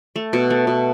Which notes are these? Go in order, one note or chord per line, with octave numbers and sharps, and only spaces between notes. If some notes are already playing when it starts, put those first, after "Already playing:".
A3
B2
A3
B2